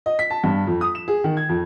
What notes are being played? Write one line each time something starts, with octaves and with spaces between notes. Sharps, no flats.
D#5
B6
A5
G2
F2
D#6
E7
G#4
D#3
G#6
F2